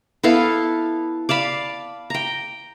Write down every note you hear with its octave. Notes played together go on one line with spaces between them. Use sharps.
B3 E4 A4 F5
D5 F5 A5 B5
G5 A#5